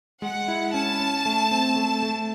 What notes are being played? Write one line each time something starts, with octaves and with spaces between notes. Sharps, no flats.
G#3 F#5
E4
C#4 A5
C#4
A3
C4
A3
A3